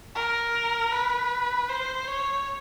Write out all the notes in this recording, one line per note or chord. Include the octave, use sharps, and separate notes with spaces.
A#4
B4
C5
C#5